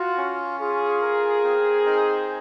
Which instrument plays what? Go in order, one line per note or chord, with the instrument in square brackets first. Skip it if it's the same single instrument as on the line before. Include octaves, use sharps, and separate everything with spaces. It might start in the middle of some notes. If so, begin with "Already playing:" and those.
Already playing: [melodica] F4 [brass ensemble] F#4
[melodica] C#4
[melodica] F4 [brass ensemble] G#4
[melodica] A#4
C4
D#4